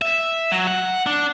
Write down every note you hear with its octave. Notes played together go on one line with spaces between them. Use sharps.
E5
F#3
F#5
D4